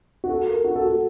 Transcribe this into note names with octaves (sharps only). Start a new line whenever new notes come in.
F#4
A4
A#4
F#4
A4
F#4